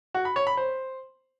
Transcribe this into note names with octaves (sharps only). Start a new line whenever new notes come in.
F#4
B5
C#5
B5
C5